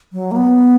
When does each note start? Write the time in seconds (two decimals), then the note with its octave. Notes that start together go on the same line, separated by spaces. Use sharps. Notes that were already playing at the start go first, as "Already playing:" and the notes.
0.13 F#3
0.31 A#3
0.36 B3